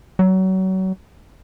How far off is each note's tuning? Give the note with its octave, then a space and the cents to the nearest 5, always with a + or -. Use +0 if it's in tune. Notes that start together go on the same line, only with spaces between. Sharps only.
F#3 +30